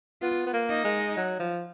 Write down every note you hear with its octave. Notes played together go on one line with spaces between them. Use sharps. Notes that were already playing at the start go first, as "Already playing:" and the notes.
B3 F4
B3
A#3
D#4
G#3
F#3
F3